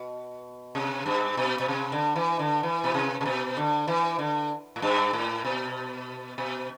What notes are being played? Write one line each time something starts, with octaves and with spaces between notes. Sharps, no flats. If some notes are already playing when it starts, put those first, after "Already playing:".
Already playing: B2
C3
G2
B2
B2
C3
D3
E3
D3
E3
B2
C3
C3
B2
D3
E3
D3
A2
G2
A2
B2
B2